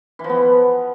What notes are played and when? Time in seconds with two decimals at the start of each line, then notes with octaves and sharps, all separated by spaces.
0.19 E3
0.24 F3
0.29 B3